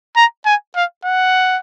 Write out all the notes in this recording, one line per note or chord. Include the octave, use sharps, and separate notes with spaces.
A#5
G#5
F5
F#5